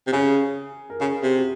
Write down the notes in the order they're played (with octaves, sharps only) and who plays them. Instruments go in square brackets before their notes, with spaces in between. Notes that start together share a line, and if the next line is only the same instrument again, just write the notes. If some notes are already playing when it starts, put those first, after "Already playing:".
[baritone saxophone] C3
[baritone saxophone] C#3 [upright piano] G#4
[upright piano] A#4
[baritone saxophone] C#3 [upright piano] G#4
[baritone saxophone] C3
[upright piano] F#4